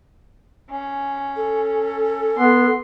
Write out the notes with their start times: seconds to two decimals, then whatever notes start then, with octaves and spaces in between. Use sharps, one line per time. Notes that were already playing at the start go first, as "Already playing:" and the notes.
0.71 C#4
1.36 A4
2.38 B3 C6